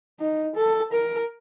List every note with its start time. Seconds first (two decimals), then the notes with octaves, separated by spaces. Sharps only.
0.20 D#4
0.56 A4
0.92 A#4